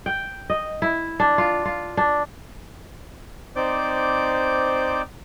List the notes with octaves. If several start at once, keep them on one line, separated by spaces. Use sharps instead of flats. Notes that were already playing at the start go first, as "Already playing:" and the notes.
G5
D#5
E4
D4
F4
F4
D4
C4 D#4 C5 D5 D6 G6